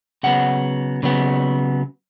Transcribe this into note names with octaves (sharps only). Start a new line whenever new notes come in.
C#3 F#3 B3 F#5
C#3 F#3 B3